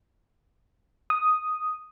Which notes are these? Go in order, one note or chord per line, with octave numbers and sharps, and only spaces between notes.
D#6